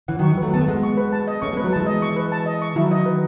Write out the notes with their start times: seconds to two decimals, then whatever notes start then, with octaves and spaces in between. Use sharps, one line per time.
0.08 C#3 E3 F#5
0.19 D#3 F#3 C#6
0.30 E3 G#3
0.38 F#3 A3 B4
0.54 B3 A5
0.61 A3
0.68 G#3 B3 F#5
0.83 C#6
0.97 B4
1.12 A5
1.27 D#5
1.42 A3 C#4 C#6
1.53 G#3 B3 B4
1.64 F#3 A3
1.72 E3 G#3 A5
1.86 D#5
2.02 C#6
2.16 B4
2.32 A5
2.46 D#5
2.62 C#6
2.76 D#3 F#3 E4
2.91 D#5
3.06 B4